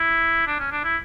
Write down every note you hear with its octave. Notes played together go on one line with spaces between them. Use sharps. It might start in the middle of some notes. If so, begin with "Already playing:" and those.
Already playing: E4
D4
C#4
D4
E4